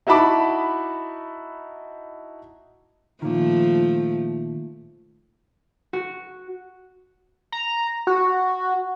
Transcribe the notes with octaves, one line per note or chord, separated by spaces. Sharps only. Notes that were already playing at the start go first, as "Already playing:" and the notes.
D#4 E4 F#4 A5 B5 D6
A#2 D#3 F3 A3
F#4
A#5
F#4